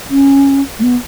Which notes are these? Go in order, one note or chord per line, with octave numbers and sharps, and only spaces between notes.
C#4
A3
B3